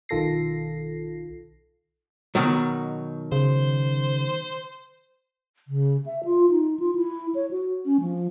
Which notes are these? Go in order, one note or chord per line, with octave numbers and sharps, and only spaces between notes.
B1 D#3 F4 A4 A#6 C7
B2 D#3 F#3
C#3 C5
C#3
E5
F4
D#4
F4
E4
C#5
F#4
C#4
F3